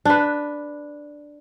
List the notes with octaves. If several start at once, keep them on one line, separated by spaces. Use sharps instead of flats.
D4 B4